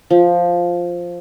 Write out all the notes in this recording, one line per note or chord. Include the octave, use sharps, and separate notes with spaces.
F3